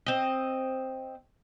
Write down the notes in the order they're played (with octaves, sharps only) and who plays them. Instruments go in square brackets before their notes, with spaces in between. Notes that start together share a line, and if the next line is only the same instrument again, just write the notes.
[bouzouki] C4 D#5